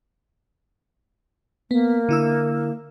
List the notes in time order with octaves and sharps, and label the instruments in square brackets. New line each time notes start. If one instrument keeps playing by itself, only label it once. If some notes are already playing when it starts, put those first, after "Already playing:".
[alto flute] A#3 [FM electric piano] B3
[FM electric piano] D3 E4 E6